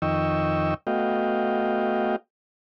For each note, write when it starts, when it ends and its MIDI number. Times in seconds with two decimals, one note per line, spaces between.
0.02 0.74 41
0.02 0.74 51
0.02 0.74 75
0.02 0.74 79
0.02 0.74 85
0.02 0.74 88
0.87 2.16 57
0.87 2.16 59
0.87 2.16 66
0.87 2.16 75
0.87 2.16 77
0.87 2.16 79